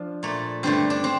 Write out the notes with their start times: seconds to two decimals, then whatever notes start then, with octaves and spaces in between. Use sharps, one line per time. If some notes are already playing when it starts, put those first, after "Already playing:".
Already playing: F3 D4
0.23 A#2 A3
0.63 G2 D3 A3 C4
0.90 D4
1.04 C4